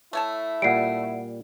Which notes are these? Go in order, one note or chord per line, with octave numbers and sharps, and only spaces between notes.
A3 E4 C#5 A5
A#2 G3 F#5 C7 D7